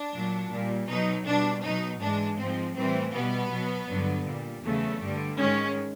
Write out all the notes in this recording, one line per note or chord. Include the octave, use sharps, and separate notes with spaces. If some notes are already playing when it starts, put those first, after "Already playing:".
Already playing: D4
A#2 F#3
A#2 G3
B2 F#3 D#4
B2 G3 D4
B2 F#3 D#4
G#2 E3 G#3 D4
G#2 F3 G#3 C4
A2 E3 G3 C4
B2 G3 B3
B2 F#3
G2 D3 F#3
A#2 G3
E2 C#3 F#3 A3
G2 D3 G3
G#2 D#3 G#3 C#4